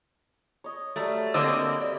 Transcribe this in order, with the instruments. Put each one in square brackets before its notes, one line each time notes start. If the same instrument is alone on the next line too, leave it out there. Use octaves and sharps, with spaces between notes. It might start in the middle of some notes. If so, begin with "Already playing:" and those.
[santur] C#5 D#5
[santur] F#3 G3 [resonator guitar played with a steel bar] A3
[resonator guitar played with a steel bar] D3 A#3 C4 [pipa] D4 D#5 [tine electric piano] E6
[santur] G4 E5 [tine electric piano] D5